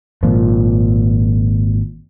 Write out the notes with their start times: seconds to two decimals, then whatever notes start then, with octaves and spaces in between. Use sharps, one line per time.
0.23 G#1 A#2 F3